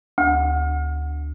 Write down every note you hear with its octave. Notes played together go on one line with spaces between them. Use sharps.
D2